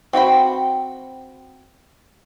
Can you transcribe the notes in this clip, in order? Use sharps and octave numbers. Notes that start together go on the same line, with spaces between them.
C4 F#4 G5 B5